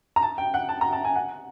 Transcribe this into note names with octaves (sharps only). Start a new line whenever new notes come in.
A#5
A5
G5
F#5
A5
A#5
A5
G#5
F#5